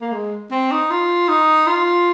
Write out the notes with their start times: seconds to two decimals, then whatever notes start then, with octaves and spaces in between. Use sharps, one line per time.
0.01 A#3
0.12 G#3
0.51 C4
0.71 D#4
0.91 F4
1.28 D#4
1.67 F4